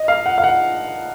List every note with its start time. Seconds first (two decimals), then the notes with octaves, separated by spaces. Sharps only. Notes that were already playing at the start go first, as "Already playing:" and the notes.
Already playing: D#5
0.08 F5
0.26 F#5
0.38 F5
0.44 F#5